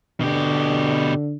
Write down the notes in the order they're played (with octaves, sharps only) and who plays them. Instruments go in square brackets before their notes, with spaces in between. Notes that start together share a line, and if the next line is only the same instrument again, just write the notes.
[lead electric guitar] B2 G4 [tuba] D3